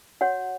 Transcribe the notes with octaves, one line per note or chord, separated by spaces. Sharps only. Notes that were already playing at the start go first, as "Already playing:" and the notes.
F#4 C#5 F#5